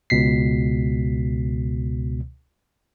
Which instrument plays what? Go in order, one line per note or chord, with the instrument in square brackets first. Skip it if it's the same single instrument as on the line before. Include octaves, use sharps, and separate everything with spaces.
[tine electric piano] C#2 B2 B6 C7